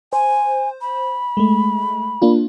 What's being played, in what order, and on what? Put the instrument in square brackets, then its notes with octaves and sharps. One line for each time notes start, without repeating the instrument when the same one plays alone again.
[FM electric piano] C5 [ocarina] G#5
[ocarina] B5
[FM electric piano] G#3 A3
A#3 D4 F4